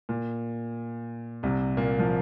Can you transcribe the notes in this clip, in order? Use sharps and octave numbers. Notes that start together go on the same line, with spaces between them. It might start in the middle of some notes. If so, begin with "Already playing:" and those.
A#2
C2 C3
A#2 A#3
F3